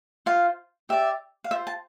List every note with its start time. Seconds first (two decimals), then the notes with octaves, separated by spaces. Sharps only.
0.26 F4 C5 F5
0.89 G4 D5 E5
1.44 F5
1.51 F4 C5 E5
1.67 A5